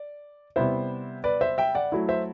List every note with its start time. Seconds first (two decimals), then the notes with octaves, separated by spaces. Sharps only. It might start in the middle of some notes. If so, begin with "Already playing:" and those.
Already playing: D5
0.56 C3 G3 B3 E4 C5 E5
1.24 B4 D5
1.41 C5 E5
1.58 E5 G5
1.75 D5 F#5
1.92 F#3 A3 E4
2.09 C5 E5